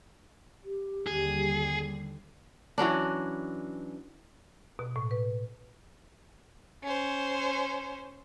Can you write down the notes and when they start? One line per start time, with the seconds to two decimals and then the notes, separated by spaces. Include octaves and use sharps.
0.65 G4
1.07 D#2 D3 G3 G#4
2.78 E3 F#3 C#4 D4
4.79 B2
4.96 A2
5.11 B4
6.83 C#4 C5